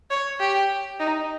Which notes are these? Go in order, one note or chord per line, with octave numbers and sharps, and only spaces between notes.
C#5
G4
D#4